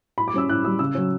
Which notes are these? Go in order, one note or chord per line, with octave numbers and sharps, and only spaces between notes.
A2 B5
D6
G3 C#4 E6
A2 F#6
G3 C#4 E6
C#3 E6
F#3 C#4